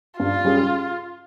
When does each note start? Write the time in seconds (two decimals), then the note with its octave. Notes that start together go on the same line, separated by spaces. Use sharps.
0.19 G2 F4
0.44 G3 C#4 G#4